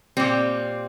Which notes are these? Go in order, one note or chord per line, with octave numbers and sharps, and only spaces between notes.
A#2 G3 C4